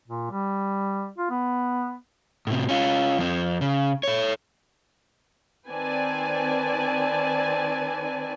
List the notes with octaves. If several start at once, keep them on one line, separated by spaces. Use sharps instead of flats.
A#2
G3
F4
B3
A2 C3
C#4 F4
F2 C4
C#3
A4 C#5
D#3 C4 B4 D5 G#5 A5